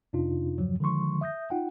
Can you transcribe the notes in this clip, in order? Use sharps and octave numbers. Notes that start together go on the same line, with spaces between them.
F2 C3 D4 D#4 F4
E2 G2 C#3 F3 F#3
D3 D#3 F3 G#3 C6 C#6
E5 D#6 G6 A#6
D#4 F4 F#5 G5